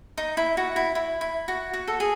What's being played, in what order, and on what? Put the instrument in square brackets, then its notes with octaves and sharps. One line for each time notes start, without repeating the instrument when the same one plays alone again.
[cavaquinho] D#4
E4
F#4
E4
E4
E4
F#4
F#4
A4
G#4